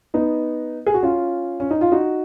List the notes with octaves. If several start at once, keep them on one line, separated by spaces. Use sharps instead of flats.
B3 D#4
G#4
F#4
C#4 F4
C#4
D#4
F4
D#4 F#4